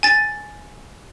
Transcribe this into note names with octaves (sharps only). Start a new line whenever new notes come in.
G#5 A6